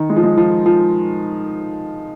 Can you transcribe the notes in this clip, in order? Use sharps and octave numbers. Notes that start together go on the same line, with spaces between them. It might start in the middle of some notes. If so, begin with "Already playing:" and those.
Already playing: D#3
G#3
F3
G#3
F3
F3